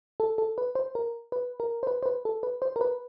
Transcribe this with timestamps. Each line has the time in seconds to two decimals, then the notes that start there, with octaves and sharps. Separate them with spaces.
0.20 A4
0.38 A4
0.58 B4
0.75 C5
0.95 A#4
1.32 B4
1.60 A#4
1.83 C5
1.87 B4
2.03 C5
2.06 B4
2.25 A4
2.43 B4
2.62 C5
2.76 A#4
2.81 B4